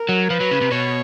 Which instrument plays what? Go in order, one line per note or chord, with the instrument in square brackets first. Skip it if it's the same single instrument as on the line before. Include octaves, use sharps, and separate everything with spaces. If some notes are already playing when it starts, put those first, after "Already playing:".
Already playing: [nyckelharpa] A#4
[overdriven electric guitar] F#3
[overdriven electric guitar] F3 [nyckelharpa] B4
[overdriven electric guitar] F#3
C#3
C3
[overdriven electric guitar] B2 [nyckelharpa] C#5